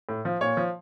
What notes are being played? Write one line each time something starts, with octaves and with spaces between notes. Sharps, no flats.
A2
F3
A#2 C#5
F3